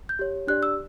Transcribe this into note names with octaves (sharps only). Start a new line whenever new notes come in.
G6
G4 C#5
D4 G4 D5 F#6
E6